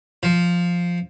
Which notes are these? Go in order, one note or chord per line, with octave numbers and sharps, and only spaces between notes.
F3